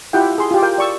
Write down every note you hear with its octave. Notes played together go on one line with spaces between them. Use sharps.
E4 F4 G4 F#5 G5
G#4 C6
F4 G4
A#4 F5 G5
D5 C#6 E6